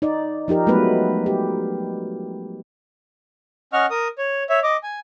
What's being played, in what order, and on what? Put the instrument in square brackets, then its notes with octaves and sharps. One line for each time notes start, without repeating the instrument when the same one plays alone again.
[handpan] D#4 D5
F3 D#4 G4 A#4
F#3 G#3 A3 B3 B4
G4
[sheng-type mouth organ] C#4 D#5 F#5 C#6 F6
A#4 D#6
C#5
C#5 E5
D#5 D6
G#5